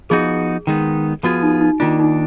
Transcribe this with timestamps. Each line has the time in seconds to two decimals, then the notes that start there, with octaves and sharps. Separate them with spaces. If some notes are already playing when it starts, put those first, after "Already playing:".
0.10 F3 B3 D#4 F#4 G#4
0.67 D#3 G#3 B3 D#4
1.23 F3 B3 F4 F#4 G#4
1.43 D#4
1.61 D#4
1.80 D#3 A#3 D4 F4
2.00 D#4